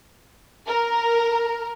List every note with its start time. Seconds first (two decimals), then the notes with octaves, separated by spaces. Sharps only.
0.67 A#4